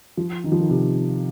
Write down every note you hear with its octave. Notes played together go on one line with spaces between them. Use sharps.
F3
D#3
F3
D#3
C3